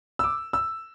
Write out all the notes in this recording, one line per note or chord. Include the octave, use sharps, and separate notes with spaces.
E6
D6
E6